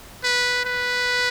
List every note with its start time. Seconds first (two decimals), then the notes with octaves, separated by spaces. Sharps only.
0.24 B4
0.65 B4